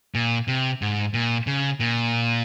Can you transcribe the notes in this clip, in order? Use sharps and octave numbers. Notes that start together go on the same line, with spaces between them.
A#2
C3
G#2
A#2
C#3
A#2